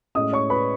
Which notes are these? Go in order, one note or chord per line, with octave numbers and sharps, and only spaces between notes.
A2 G#3 C#4 D#5 D#6
C#5 C#6
B4 B5